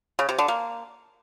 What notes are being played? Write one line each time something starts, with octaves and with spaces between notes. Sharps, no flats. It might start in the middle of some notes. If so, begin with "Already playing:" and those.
C#3
C3
D3
A#3